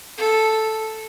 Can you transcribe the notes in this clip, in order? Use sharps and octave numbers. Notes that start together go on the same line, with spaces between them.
A4